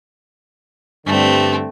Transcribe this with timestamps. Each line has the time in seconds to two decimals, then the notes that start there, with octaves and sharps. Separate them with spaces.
1.06 G2 D3 A3 C4